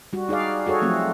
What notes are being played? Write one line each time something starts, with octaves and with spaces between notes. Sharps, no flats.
G3 F#4
D#4 G#4 D5 F5
F#4 G#4 A4 C#5
F3 F#3 A3 C4